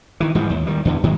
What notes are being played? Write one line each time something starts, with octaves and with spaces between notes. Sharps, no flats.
D#3 E3
G#2 E3 F3 G3
D#2
D#3 G3
E2 D3 E3
G#2 D#3 F#3 G#3